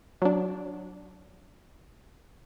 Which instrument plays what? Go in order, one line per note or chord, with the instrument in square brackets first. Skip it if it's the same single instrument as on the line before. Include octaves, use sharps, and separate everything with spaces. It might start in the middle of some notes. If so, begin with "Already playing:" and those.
[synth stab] F#3 D4